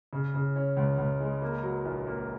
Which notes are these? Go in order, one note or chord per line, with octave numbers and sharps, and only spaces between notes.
C#3
C#3
C#4
C#2
C#2
G#3
A#3
F#3
A#1
A#3